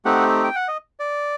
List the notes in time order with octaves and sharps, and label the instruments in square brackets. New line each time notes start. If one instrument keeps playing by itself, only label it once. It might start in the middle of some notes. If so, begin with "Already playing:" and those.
[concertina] A3 C4 D#4 G4 F#5
G5
F#5
D#5
D5